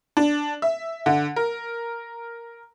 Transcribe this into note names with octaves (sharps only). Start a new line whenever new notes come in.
D4
E5
D3
A#4